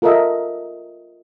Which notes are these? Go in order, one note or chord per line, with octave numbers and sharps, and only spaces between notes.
F4 A4 A#4 D#5 E5